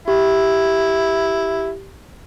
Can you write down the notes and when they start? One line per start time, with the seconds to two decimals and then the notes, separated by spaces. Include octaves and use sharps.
0.08 E4 G4